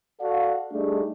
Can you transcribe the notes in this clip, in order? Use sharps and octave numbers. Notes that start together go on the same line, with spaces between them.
F#4 A4 D5 F5
G3 A3 D4 D#4 G#4